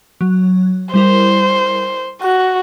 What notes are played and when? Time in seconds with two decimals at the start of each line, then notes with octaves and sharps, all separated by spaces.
0.21 F#3
0.94 G3 E4 A#4 C5
2.22 F#4 F#6